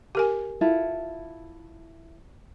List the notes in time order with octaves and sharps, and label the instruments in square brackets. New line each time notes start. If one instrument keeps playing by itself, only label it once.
[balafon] G4 A#4 G#5
[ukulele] E4 F4 A4